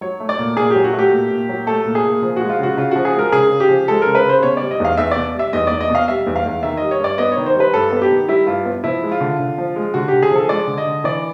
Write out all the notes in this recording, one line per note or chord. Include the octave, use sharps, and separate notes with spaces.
F#3 C#5
A3
D5
A#2
A#2 G#4
F#3 G4
F#4
A3
G4
A#2
A#2
F#3
A3 A4
A#2
G#4
A#2
F3
G#3 F#4
F4
C#3 F#4
C#3 F4
F3 F#4
G#4
G#3 A#4
C#3 G#4
C#3
G4
F3
G#3 A4
C#3 A#4
B4
C#3 C5
C5
B2 C#5
G3 D5
D#5
E2 F5
E2 E5
B2 D5
G3 E5
E2 D#5
E2 D5
D#5
B2
F5
G3 E5
E2
F5
E2
D#3 E5
G3 D#5
C#5
G2 D5
B3 D#5
C#5
D#3
C5
G3
B4
G2 A4
B3
G4
D#3
G3 E4
G2 F4
B3
F3 E4
G#3
F4
D3
D3
F3
G#3
D3 F#4
D3 G4
G#4
F3 A4
G#3 D5
D3
D#5
D3
E3 D5